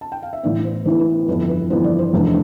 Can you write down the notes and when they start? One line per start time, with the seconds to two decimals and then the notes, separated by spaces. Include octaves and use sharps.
0.01 A5
0.12 G5
0.23 F5
0.33 E5
0.43 A1 A2 E3 B3 D5
0.65 C5
0.85 A1 A2 E3 B3 C5
0.99 B4
1.28 G1 F2 E3 B3 B4
1.49 B4
1.70 G1 F2 E3 B3 C5
1.84 D5
1.99 C5
2.13 F1 E2 D3